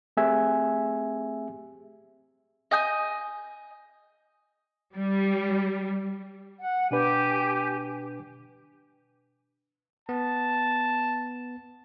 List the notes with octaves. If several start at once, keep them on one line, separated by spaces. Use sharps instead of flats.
A3 C4 G4 G#4 E5 G#5
D#5 G#5 D#6 G6
G3
F#5
B2 D4 G4 B4 G#5
B3 A5